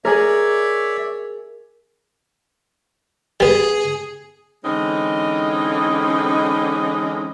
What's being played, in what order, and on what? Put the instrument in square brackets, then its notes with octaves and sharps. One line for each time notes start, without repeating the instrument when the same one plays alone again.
[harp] G#4 A#4 [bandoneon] C#5 D5 E5
[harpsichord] G3 B3 [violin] G#4
[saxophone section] D3 E3 G#3 C4 C#4 D#4